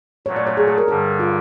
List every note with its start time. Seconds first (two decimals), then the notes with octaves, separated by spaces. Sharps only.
0.26 A#2 F#3 A3 C#5
0.36 D5
0.47 C#5
0.57 G#4
0.67 A4
0.78 A#4
0.88 G2 D3 G3 A4
1.20 F4